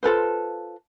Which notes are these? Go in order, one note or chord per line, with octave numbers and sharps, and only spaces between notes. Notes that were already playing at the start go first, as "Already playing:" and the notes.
F4 A4 B4 C5